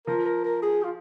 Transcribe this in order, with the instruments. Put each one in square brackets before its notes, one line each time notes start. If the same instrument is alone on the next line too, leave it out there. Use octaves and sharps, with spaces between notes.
[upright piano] F3 [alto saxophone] A#4
[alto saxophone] A#4
A#4
G#4
F4